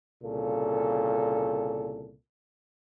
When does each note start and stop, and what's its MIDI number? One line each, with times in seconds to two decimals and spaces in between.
0.23 2.14 36
0.23 2.14 46
0.23 2.14 49
0.23 2.14 69